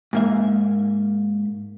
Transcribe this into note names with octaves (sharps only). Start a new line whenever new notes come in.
G#2 A#3 E5